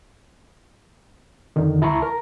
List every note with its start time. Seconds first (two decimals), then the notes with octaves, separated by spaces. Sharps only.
1.56 F2 D3 D#3
1.81 C#2 E4 A5 A#5 C6 C#6
2.02 A#4 A#5